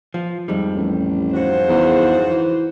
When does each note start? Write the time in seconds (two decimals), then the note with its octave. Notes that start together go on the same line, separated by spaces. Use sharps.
0.14 F3
0.48 F2 G#2 G3
0.77 A1
1.34 G#2 C#3 F#4 C5
1.69 E2
2.30 E3